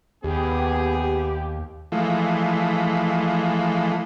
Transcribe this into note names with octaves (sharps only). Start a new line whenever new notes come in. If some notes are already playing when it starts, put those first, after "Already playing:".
D#2 B3 G4 G#4
E3 F3 G#3 A3